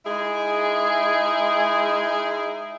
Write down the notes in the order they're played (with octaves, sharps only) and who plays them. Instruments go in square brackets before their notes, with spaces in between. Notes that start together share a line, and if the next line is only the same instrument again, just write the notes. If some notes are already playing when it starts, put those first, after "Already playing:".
[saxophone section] G#3 D#4 E4 G#4